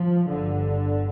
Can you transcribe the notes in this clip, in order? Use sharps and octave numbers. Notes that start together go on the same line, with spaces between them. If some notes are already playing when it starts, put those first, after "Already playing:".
Already playing: F3
G1 G2 D3